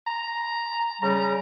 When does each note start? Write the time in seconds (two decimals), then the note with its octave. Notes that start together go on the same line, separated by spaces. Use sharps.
0.07 A#5
1.02 C#3 G3 A#5